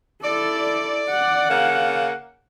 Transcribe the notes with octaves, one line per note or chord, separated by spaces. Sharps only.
E4 A4 D5
F#5
C#3 A#3